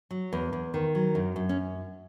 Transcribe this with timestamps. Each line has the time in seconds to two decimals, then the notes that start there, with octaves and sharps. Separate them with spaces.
0.11 F#3
0.33 E2
0.53 E2
0.74 D#3
0.95 F#3
1.15 F#2
1.36 F#2
1.49 C#4